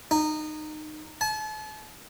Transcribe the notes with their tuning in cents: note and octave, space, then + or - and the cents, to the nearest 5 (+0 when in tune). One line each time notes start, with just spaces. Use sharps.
D#4 -20
A5 -40